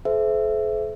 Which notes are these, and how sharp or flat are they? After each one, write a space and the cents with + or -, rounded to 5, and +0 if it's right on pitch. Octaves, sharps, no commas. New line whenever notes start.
A4 -45 C5 -25 E5 +10